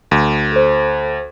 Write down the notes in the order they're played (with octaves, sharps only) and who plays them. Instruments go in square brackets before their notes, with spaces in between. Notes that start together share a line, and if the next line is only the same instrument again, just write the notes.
[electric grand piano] D2
[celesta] A4 C5